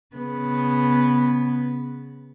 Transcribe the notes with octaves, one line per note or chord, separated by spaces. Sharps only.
C#3 B3